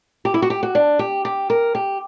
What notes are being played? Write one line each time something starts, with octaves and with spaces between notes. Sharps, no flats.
G4
E4
F#4
G4
F#4
D4
G4
G4
A#4
G4